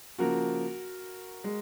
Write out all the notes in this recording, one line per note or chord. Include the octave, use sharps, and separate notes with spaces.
C#3 F3 A#3 F#4 A#4
G#3